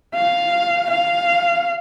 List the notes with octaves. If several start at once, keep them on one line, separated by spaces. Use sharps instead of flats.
F5
F5